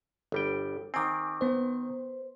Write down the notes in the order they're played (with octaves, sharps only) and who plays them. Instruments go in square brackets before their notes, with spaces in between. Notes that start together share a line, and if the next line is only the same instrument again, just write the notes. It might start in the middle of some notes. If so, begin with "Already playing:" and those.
[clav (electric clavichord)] G1 G3 G5
[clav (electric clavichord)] D#3 C4 [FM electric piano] G#5 D6
[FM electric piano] B3 C5